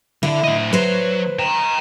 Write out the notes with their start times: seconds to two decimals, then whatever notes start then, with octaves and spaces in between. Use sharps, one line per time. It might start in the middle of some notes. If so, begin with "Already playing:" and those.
0.23 D3 E4
0.44 A2 D#5
0.73 F#3 B4 C5
1.39 G5 A#5